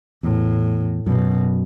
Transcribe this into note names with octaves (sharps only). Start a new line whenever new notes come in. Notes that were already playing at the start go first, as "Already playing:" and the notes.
E2 A2
F#2 B2